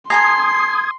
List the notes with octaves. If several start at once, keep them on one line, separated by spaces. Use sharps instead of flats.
A4 G#5 A#5 C6 D#6 G#6 C7